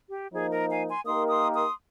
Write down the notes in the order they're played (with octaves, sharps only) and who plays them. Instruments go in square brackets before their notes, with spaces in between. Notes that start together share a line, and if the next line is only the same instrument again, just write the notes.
[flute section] G4
[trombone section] F3 A#3 D#4 [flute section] G#4
[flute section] A#4
F5 G#5
G#5 C6
[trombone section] A#3 D#4 G4 A#4 [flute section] C6 D#6
[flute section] C6 D#6
C6 D#6